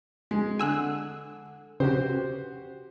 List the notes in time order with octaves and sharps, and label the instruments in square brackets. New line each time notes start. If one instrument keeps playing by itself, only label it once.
[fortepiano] G#3
[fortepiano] D3 [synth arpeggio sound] G#5 E6 F#6
[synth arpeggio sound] C#3 [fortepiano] F#4 G4 C5